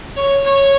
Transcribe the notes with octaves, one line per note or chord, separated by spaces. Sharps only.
C#5
C#5